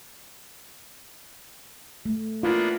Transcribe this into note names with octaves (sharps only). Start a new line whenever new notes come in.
A3
A#3 B3 D4 E4 F4